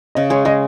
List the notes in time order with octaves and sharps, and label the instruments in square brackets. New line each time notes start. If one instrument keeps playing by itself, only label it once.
[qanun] C#3 [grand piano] D#5
[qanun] G#3 [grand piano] C#5
[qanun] G#3 [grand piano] D#5